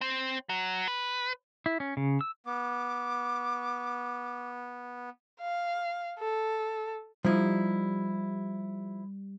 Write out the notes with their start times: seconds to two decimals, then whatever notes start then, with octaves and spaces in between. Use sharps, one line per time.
0.01 C4
0.49 F#3
0.88 B4
1.66 E4
1.80 C#4
1.97 C#3
2.21 E6
2.46 B3 D6
5.41 F5
6.18 A4
7.25 F3 G3 D#4 E4